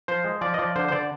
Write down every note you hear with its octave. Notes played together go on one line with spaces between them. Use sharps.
F3 C5
G#3
F3 D5
D#5
F3 D5
D3 C5
C5
D3 D5